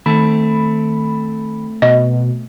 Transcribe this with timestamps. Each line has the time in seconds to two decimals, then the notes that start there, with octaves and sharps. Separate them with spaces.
0.06 D#3 A3 C4 B5
1.82 B2 D#5